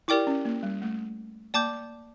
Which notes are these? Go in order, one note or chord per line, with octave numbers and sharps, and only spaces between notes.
E4 G4 A#4 D5 G5 D6
C#4
A#3
G3
A3
A#3 D5 A5 D6 G6